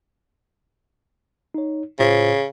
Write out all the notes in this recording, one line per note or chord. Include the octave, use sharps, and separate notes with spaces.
D#4 C#5
A2 C#3 F4 C5